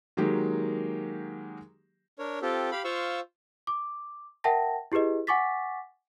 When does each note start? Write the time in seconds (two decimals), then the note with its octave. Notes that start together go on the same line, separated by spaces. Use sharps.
0.17 D#3 F#3 G#3 A#3 G4
2.19 D4 A#4 C#5
2.42 C4 F4 G4 A4
2.72 G4 F5 B5
2.85 F4 C5 F5 C#6 E6
3.67 D6
4.44 A#4 E5 F#5 G5 A5 A#6
4.92 E4 G4 G#4 B4 D#5
5.27 F#5 G#5 C#6 D6 A6 B6